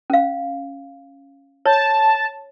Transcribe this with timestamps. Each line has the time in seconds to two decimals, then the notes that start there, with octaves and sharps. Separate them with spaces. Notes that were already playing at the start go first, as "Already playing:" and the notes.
0.10 C#4 F5
1.65 C#5 A5